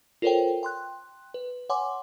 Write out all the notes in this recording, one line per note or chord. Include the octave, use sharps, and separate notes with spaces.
F4 A4 A#4 C5 C#5 G5
G5 C6 F#6
B4
C#5 F#5 G#5 C6 D6